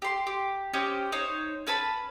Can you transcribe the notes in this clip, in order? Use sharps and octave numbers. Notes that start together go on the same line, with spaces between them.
G4 C6
G4
C#4 G4 C5 D#5
D#4 C5 C#5
C#4 B4 A5 B5